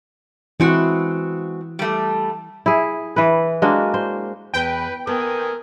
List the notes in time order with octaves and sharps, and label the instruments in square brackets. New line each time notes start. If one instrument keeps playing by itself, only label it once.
[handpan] E3 E4 [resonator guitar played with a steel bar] G#3 C4 F#4
[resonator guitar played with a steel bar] G3 A3
[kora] E4 G#4
E3 B4
G#3 A#3 D4 F#4
C5
[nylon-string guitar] E2 [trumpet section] B4 [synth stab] G5
[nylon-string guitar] A#3 B3 [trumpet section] A4 G#5 [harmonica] A#4 D#6